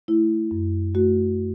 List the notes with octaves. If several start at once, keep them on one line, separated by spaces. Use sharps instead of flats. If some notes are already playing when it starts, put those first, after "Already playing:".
A3 E4
F#2
A3 F#4